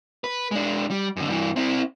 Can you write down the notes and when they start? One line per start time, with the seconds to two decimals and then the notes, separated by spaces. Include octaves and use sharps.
0.24 B4
0.51 G#3 D4
0.90 G3
1.16 F#2 D3
1.28 G2 E3
1.56 C4 E4